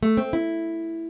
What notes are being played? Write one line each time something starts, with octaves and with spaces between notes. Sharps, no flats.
A3
C4
E4